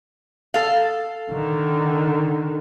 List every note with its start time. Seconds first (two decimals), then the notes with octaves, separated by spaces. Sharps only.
0.54 A4 F5
1.30 D3 D#3